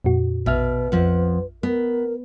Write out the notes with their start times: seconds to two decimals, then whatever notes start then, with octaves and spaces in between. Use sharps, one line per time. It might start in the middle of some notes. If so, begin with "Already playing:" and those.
0.04 F2 A#2 F#4
0.46 A#1 B2 B4 E5 F6
0.92 F2 F3 F#5
1.63 B3 A#4